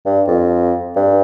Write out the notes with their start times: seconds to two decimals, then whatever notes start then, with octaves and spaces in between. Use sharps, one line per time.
0.06 G2
0.28 F2
0.96 G2